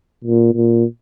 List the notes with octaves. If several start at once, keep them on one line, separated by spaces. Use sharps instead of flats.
A#2
A#2